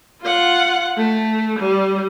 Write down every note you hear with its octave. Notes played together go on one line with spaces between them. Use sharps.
F4 F#5
A3
G3